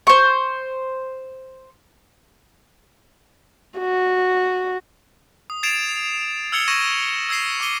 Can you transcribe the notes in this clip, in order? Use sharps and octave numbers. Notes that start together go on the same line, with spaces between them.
C5 C#6
F#4
D#6
G#6 A6 C7 D7 E7 F7
E6 F6 G#6 C#7 F7 G7
C#6 E6 G#6 A#6 D#7 E7
E6 G#6 A#6 C7 E7
C#6 D6 D#7 G7